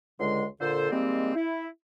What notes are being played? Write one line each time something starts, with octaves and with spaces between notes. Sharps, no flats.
C#2 D3 G#3 C6
A#2 D3 A4 C5
D#3 G3 G#3 A#3 C4
E4